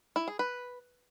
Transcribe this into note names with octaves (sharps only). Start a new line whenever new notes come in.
E4
G#4
B4